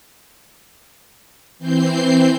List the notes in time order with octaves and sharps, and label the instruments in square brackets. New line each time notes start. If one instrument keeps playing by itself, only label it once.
[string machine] E3 C4 G6 C7